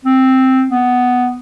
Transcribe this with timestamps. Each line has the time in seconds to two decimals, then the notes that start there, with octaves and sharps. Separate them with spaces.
0.05 C4
0.69 B3